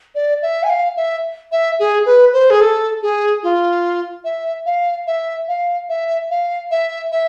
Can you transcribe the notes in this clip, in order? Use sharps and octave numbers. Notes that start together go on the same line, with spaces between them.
D5
E5
G#5
F5
E5
E5
G#4
B4
C5
G#4
A4
G#4
F4
E5
F5
E5
F5
E5
F5
E5
E5